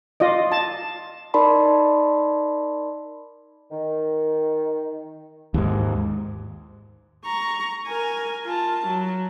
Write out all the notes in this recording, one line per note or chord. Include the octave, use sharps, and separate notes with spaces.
F4 D5 D#5
A5
D#4 A#4 D5 A5 B5 C6
D#3
D#2 G#2
A#5 C#6
A#4 G#5
F4 A5
F#3